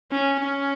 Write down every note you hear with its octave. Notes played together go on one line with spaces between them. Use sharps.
C#4
C#4